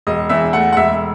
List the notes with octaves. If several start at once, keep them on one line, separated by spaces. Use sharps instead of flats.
E1 D#5
E2 E5
A3 F#5
F#5
E1 E5